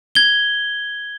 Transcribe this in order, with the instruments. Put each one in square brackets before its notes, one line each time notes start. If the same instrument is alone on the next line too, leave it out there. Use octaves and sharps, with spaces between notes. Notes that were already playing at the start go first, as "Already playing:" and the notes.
[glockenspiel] G#6 G7